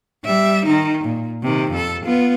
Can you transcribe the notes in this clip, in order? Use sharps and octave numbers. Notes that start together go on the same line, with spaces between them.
G3 E5
D#3 D#4
A#2
C3 D#3
F2 A4
B3 F4